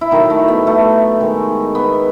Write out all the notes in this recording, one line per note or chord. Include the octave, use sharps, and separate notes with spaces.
E4
A2 D#3 F#3 A3 D#4
A3
B3
A3
D#3 G#3
B3